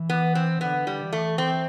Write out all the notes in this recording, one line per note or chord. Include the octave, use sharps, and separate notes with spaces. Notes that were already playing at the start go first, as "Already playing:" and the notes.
Already playing: E3
B3
C4
D3 B3
G3
E3
A3
C4